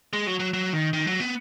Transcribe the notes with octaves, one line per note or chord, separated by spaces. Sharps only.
G#3
F#3
F#3
F#3
D#3
D#3
F#3
B3